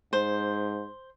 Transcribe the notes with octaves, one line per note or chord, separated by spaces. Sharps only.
G#2 C5